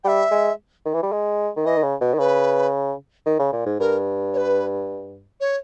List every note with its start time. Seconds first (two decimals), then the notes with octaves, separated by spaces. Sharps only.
0.04 G3 E5 G5
0.31 G#3
0.85 D#3
0.94 E3
1.03 G3
1.12 G#3
1.57 D#3
1.65 E3 D#5
1.76 D#3
1.83 C#3
2.01 B2
2.14 D#3
2.18 C#3 B4
3.26 D#3
3.39 C#3
3.52 A#2
3.66 G#2
3.80 G2 A#4
4.34 C#5
4.37 B4
5.41 C#5